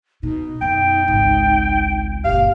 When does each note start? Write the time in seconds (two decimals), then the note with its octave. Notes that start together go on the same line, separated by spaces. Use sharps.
0.23 B2 D#4
0.62 F#2 B2 G5
1.08 G#1 C#2
2.24 F#1 A#2 G4 F5